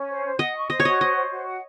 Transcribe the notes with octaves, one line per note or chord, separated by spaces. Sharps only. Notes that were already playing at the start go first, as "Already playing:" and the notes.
Already playing: C#4
C5
C5
D#5 F#5
C#6
C5 D#5
C#5
F#4 D#5
C5 D#5
C5
F#4
F#5